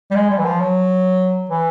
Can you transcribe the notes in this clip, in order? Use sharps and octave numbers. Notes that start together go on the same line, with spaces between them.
G3
G#3
G3
E3
F3
F#3
E3